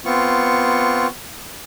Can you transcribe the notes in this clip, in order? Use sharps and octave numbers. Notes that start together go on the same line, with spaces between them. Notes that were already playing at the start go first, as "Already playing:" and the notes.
B3 C4 F4 C#6